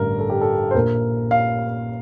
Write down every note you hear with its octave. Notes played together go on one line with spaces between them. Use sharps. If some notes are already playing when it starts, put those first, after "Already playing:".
Already playing: A1 G2 D3 A#4
A4
G4
A4
C5
A#1 A#2 A#4
F5